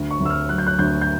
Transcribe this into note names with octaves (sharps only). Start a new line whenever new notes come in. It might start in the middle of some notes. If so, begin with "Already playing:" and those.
Already playing: D2
C#6
D2
E6
F6
F#3 F#6
G6
F#6
D2 G6
G6